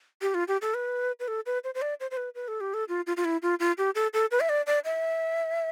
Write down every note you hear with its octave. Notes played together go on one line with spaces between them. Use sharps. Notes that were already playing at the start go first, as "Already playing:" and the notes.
G4
F4
G4
A4
B4
B4
A4
B4
C5
C5
D5
C5
C5
B4
B4
A4
G4
A4
F4
F4
F4
E4
F4
F4
G4
A4
A4
B4
E5
D5
D5
E5